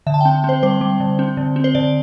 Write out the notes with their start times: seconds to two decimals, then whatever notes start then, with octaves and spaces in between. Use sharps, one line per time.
0.07 D3 E5
0.14 A5
0.21 C4 G5
0.44 C4 C5
0.63 G3 C5
0.81 G3
1.00 D3
1.19 C4
1.37 D3
1.56 C4
1.64 C5
1.75 D3 D5